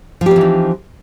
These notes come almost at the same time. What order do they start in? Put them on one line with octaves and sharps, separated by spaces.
F3 G4 C4 E3 D#4